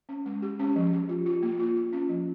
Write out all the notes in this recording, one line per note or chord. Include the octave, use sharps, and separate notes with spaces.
C#4
G#3
G4
C#4
F3
G4
F4
F4
A#3
F4
F4
C#4
F3